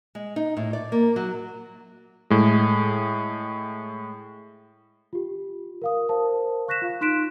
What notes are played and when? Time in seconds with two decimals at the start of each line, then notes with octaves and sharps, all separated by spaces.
0.15 G#3
0.36 D#4
0.57 A2
0.73 D5
0.92 A#3
1.16 F#3
2.30 A2 G#3
5.13 F4 G4
5.82 A#4 F5 D#6
6.09 A#4 C5 F5 A5
6.68 C#6 F#6 A#6 B6 E7
6.82 F4 F5
7.01 D#4 C6 F#6 B6 D7 E7